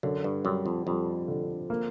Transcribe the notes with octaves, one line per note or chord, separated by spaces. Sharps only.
F#2 D3
G2
F#2 G3
F2
F2 G3
D3
A#3